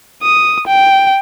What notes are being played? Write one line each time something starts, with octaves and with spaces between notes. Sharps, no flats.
D#6
G5